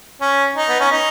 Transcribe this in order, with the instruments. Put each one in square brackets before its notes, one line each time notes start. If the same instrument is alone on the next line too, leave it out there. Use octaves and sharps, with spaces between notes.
[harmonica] C#4
D#4
B3
C#4
D#4